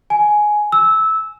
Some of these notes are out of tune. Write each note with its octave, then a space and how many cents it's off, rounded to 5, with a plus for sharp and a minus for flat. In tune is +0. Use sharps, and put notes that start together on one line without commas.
G#5 +10
E6 -15